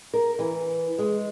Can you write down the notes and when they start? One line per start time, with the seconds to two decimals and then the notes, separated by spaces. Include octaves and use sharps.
0.14 A#4
0.39 E3
0.98 G#3